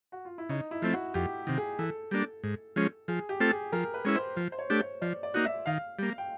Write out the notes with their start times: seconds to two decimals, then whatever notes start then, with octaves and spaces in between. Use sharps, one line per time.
0.12 F#4
0.25 F4
0.38 E4
0.49 C#3 D#4
0.71 E4
0.82 F3 A3 C4
0.93 F#4
1.14 F2 G4
1.47 C3 D#3
1.57 G#4
1.79 E3 A4
2.11 G3 A#3 D4
2.44 G#2
2.76 F3 G#3 C#4
3.08 F3 G#4
3.29 G4
3.40 A3 C4 F4 A4
3.52 G#4
3.72 F3 A#4
3.94 B4
4.05 G#3 C#4 E4
4.15 C5
4.37 F3
4.52 C5
4.59 C#5
4.70 A3 D4 G4
4.80 C#5
5.01 F3 D5
5.23 D5
5.34 A#3 D#4 F#4
5.45 E5
5.66 D#3 F5
5.99 G3 A#3
6.18 G5